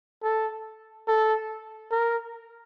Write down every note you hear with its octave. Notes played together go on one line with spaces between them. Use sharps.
A4
A4
A#4